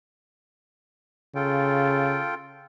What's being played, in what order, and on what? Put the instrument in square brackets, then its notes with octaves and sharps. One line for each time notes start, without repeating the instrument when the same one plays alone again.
[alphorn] C#3 [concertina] F4 A4 G5